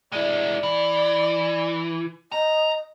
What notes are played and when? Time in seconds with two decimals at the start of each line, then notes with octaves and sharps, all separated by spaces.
0.12 G#3 E4 D5
0.63 E3
2.32 D#5 A#5